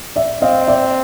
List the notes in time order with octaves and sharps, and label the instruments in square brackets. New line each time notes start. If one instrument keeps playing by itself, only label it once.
[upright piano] D5 E5
[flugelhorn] C4 [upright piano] D#5 F5
[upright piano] D5 E5